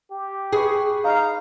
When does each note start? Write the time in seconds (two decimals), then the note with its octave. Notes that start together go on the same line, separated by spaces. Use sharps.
0.11 G4
0.53 G#4 B4 B5 C#6
1.04 D#4 D#5 F5 A#5